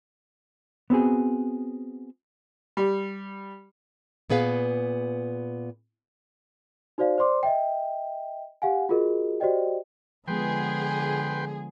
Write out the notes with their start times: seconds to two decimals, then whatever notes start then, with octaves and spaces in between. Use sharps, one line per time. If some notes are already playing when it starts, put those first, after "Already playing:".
0.90 B3 C4 F#4 G#4
2.77 G3
4.30 A#2 B3 G#4 B4 F5
6.98 D#4 F#4 C5 D5 F5
7.18 C5 D5 C6 D6
7.43 D#5 E5 G5
8.62 G4 F5 F#5 G#5
8.89 F4 F#4 G#4 A#4 D#5
9.40 F#4 G4 C5 D5 D#5 G5
10.28 D3 F3 G#3 B3 G#4 B4 G5 C6